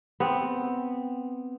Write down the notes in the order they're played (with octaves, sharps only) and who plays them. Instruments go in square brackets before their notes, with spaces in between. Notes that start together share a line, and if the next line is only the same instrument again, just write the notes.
[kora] B3 C4